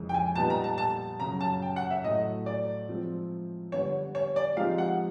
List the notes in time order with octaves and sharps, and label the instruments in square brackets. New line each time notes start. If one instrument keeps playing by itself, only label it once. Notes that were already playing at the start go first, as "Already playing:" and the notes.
Already playing: [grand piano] F2 C#3 E3 G#3
[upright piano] G5
G#5
[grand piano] A#2 G3 B3 D#4 [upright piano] A5
[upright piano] A#5
A5
A5
[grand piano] F#2 C#3 F#3 [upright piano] A#5
[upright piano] A5
G5
F#5
E5
[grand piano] A2 F#3 A3 [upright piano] D#5
[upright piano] D5
[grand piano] F3 G#3 C4
[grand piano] D3 G3 B3 [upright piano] C#5
[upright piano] C#5
D5
[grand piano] F3 G#3 C4 D#4 G4 [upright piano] F5
[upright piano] F#5